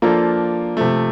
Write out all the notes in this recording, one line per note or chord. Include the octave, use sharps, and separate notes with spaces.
F3 A#3 D4 F4 A4
C3 F3 A3